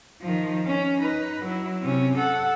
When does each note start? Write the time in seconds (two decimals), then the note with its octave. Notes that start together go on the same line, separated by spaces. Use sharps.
0.22 D#3 F3
0.66 C#4
1.01 D#4 B4
1.43 F#3 E4
1.82 C3 C#4
2.18 A4 F#5